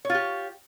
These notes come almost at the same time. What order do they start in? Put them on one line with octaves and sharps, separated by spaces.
C#5 F4 G4